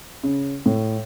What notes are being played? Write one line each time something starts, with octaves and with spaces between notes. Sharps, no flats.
C#3
A2